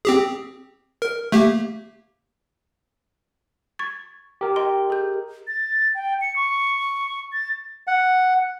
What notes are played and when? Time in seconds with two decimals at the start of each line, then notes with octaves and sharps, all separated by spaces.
0.05 C4 G4 G#4
1.02 A#4
1.32 A3 A#3 G4
3.79 C#6 G#6 A6
4.41 G4 A#4
4.56 D#5 G5 C6
4.90 G#4 G6
5.47 A6
5.95 G5
6.21 C#7
6.36 C#6
7.33 A6
7.87 F#5